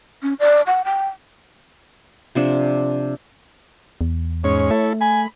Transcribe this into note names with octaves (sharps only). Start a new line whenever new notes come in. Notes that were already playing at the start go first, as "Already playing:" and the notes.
C#4
D5
F#5
G5
C3 F3 D4
E2
G#2 C#4 C#5
A3 E4 A4
G#5 B5